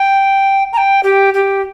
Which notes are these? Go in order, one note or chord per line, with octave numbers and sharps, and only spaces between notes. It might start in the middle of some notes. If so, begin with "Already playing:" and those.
Already playing: G5
A#5
G5
G4
G4